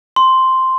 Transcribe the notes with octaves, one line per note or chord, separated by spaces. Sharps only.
C6